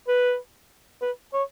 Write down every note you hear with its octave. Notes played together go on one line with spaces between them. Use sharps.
B4
B4
C#5